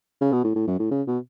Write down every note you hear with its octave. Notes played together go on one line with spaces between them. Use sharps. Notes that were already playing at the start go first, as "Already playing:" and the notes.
C#3
B2
A2
A2
F#2
A2
C#3
B2